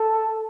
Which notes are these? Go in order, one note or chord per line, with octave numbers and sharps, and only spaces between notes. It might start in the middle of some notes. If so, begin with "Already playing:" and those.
Already playing: A4